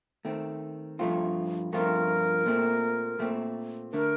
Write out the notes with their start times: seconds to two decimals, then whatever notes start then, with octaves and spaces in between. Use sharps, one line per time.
0.25 D#3 A3 C4
0.99 G2 F3 A3 C4 F4
1.72 G2 F3 A3 C4 F4 A#4
2.46 A#2 A3 C4
3.19 A#2 A3 C4
3.92 D3 A3 A#4